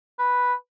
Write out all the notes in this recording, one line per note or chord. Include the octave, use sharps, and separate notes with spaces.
B4